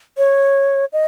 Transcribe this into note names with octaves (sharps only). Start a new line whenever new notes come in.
C#5
D#5